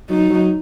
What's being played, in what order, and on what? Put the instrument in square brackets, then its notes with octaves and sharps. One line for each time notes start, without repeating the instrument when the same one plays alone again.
[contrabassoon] F#3 [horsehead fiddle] D#4
[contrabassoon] F#3